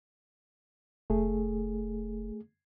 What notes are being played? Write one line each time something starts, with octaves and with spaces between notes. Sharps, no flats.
F1 A3 G#4